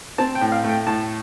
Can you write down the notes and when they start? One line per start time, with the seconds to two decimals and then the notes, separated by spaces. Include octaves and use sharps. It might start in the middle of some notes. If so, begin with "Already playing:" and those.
0.18 C4 A5
0.35 G5
0.41 A2
0.52 F5
0.64 A3
0.69 G5
0.86 A2 A5